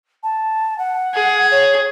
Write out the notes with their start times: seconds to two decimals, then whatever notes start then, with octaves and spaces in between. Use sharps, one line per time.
0.23 A5
0.78 F#5
1.14 G#4
1.51 C#5